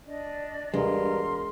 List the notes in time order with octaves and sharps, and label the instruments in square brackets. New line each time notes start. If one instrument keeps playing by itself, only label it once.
[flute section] D4 D5 D#5
[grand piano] E1 [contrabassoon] G2 [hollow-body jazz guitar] G#3 [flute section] A#4 C6